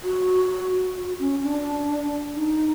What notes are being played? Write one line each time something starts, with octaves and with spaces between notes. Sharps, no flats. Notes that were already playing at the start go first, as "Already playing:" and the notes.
F#4
F#4
C#4
D4
D#4